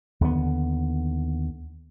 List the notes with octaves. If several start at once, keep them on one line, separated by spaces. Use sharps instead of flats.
D#2 D3 A3 B3